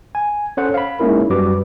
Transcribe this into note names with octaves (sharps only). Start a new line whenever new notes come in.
G#5
C#4 A4 C5 C#5 F#5
F5 B5
G#3 A#3 C#4 D#4 E4 A#4
F#2 G3 F#4 B4 D6